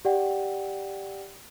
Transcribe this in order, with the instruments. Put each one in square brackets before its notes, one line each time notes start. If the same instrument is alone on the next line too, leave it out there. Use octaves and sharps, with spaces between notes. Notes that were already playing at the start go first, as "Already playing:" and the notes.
[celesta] G4 D5 F#5 G5